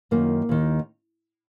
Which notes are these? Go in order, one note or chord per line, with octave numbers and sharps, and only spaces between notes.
F#2 D#3 A#3
D#2 D#3